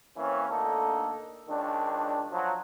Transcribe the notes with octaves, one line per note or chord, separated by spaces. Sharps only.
E3 A#3 C4 C#4
D2 A#3 D4 D#4 A4
C#2 D#3 D4
F3 F#3